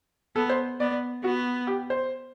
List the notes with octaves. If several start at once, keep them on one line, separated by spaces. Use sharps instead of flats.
B3 A4
C5
B3 D5
B3 F#4
G4
C5